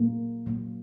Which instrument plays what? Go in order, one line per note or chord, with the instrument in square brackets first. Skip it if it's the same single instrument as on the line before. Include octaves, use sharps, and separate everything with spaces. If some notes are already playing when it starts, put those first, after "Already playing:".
Already playing: [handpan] A#2 F#3 A#3
A#2 F#3 A#3